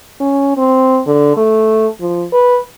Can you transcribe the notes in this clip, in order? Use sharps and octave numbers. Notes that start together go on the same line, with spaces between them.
C#4
C4
D3
A3
F3
B4